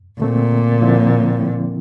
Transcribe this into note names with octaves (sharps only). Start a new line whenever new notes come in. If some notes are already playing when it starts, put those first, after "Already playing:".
A#2 D3 A3 C4
D3 F3 C4 E4